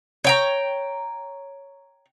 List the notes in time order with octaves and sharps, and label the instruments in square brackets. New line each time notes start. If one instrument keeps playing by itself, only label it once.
[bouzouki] C#5 G5 A#5